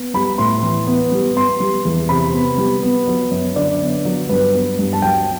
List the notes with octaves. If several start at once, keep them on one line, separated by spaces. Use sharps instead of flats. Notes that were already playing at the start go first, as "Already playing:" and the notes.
Already playing: B3
G3 B5
A2 C6
E3
B3
G3
B3 C6
G3
E2
C3 B5
B3
G3
B3
F#3
F#2
D3 D5
B3
F#3
G2 B4
B3
G2
A5
F#3 G5